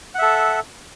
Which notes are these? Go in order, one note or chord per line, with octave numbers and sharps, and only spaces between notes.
A4 E5 F#5